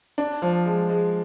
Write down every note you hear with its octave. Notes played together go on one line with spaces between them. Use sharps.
D4
F3
G#3
G#3